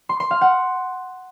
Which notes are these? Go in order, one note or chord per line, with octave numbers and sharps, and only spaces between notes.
C6
C6
F5
F#5